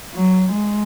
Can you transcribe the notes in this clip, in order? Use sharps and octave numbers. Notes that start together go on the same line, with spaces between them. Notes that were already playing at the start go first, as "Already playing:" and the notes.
F#3
G#3